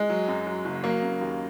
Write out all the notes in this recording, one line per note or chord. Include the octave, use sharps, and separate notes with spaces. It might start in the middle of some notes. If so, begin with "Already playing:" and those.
Already playing: G#3
F#3
F#2
F#3
F#1
F#3 A#3
C#3
D#2